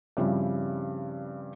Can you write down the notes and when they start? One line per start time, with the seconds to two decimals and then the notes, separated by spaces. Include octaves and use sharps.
0.17 G2 C#3 F3 G3 C4 E4